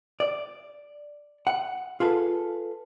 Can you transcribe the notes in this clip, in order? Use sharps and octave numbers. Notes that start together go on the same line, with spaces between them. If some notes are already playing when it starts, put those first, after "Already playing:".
D5
F#5
F4 G#4 A4 B4